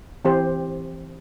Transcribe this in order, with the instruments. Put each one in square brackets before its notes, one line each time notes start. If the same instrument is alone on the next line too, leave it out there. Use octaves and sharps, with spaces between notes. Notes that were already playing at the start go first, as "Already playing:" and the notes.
[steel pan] E3 C4 G4 C5